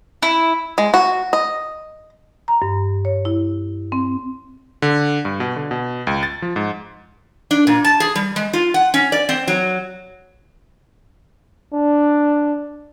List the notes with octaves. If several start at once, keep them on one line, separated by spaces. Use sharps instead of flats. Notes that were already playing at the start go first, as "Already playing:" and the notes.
E4
G#3
F#4
D#5
A#5
G2
C#5
E4
C4
D3
G2
B2
D3
B2
C#2
A6
F3
G#2
D4
A#2
A5
G#4
G3
G#3
F4
F#5
C#4
D5
C4
F#3
D4